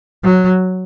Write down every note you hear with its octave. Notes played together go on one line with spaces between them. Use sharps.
F#3